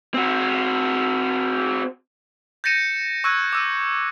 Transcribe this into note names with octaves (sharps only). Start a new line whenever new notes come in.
C4 F#4
G6 A6 A#6 C#7 D#7 E7
C#6 E6 F#6 G#6 D#7
D6 E6 D#7